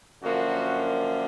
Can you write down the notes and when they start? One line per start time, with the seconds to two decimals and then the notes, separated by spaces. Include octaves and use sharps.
0.23 F#2 D3 F3 A#3 D4 F#4